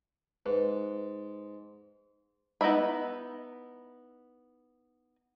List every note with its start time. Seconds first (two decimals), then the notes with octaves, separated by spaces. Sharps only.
0.46 G#2 B4
2.61 B3 D#4 E4 E5 B5